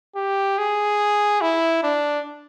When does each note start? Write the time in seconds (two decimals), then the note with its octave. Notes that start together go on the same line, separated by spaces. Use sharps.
0.16 G4
0.58 G#4
1.41 E4
1.83 D4